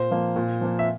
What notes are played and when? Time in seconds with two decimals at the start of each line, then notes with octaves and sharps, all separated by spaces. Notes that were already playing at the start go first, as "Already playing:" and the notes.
Already playing: A#2 C5
0.11 F3 A#3
0.36 A#2
0.61 F3 A#3
0.79 E5